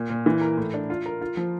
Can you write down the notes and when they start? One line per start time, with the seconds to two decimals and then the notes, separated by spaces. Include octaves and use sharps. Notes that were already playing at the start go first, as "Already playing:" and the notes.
Already playing: A#2
0.10 A#2
0.26 E3
0.41 A#4
0.57 A2
0.74 D4
0.90 F4
1.06 A#4
1.21 F4
1.37 F3